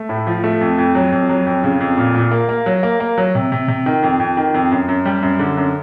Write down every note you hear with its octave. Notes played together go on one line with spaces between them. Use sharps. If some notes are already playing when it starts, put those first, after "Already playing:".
Already playing: A3
A2
F3
A3
F2
F2
F#3
F2
F#3
F2
C#3
F2
A#2
A#2
A#3
A#3
F#3
A#3
A#3
F#3
C3
C3
C3
D#3
F2
F2
D#3
F2
F#2
F#2
G3
F#2
D3
F#2